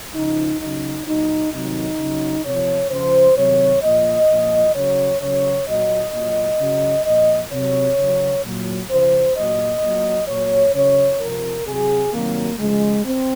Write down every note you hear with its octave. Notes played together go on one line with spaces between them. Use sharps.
C#3 F3 D#4
C#3 F#3 D#4
A#2 F#3 D#4
C3 D#3 F#3 D#4
C#3 F#3
C3 F3 C#5
C#3 F3 C5
C3 D#3 F#3 C#5
A#2 F3 D#5
A#2 F3
C#3 F#3 C#5
C#3 F#3 C#5
A#2 F#3 D#5
A#2 F#3
C#3 F#3
A#2 F3 D#5
C3 F#3 C#5
C#3 F#3
A#2 F#3
C#3 F3 C5
A#2 F#3 D#5
A#2 F#3
A#2 F#3 C#5
C#3 F#3 C#5
C3 F3 A#4
C3 F#3 G#4
C3 D#3 F#3 A#3
C#3 F3 G#3
C4